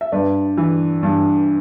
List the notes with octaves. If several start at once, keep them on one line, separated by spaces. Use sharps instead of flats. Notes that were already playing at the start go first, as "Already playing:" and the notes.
E5
G2 B4 D5
E3
G2